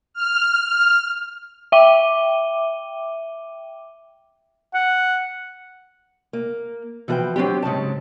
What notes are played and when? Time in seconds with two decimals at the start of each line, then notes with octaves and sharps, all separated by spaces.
0.14 F6
1.72 E5 G5 D6 D#7 G7
4.74 F#5
6.33 A#3
7.08 E3 F3 F#4 G#4 B4 G5
7.36 F#3 C4 D4 G4
7.62 G#2 C#3 F#3 A5